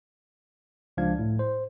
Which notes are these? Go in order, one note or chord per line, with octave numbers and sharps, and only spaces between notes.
C#2 F3 D4 F5 G#6
A2
C5